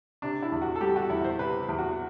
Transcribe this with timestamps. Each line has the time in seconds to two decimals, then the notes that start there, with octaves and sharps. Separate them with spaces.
0.22 C3 D4
0.42 E4
0.52 E2
0.62 F#4
0.76 A4
0.81 G3 G4
0.96 F#4
1.10 E2 E4
1.24 C5
1.39 C3 B4
1.69 E2
1.78 F#4